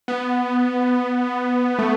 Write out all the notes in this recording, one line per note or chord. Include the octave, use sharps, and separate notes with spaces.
B3
A3